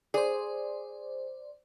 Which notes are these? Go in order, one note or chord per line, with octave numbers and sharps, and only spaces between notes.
G#4 C5 D5